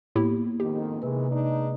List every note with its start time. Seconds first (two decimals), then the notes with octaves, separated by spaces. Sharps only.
0.16 A2 A#3 B3 E4 G4
0.60 F2 G#2 D#3 G4
1.02 C3 D#3 E3 G#3 B4
1.31 G#3 D4 D#4